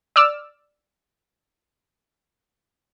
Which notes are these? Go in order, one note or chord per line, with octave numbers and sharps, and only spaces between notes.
D5 D6 E6 F6